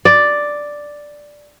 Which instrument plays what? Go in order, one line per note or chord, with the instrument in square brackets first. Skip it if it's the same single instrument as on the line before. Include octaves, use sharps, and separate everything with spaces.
[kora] D5